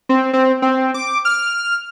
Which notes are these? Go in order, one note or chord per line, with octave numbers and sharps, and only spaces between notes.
C4
C4
C4
D6
F6